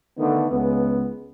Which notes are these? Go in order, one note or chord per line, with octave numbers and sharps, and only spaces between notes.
D3 D#3 A3 B3
C#2 B3